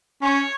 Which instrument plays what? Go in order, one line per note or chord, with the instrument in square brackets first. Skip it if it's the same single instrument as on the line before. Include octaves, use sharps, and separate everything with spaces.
[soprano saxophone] C#4 [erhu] C#5